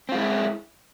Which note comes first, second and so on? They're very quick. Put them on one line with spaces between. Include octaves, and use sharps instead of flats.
C4 F4 G#3 E4